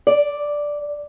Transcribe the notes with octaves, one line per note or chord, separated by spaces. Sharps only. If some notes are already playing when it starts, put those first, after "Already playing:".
D5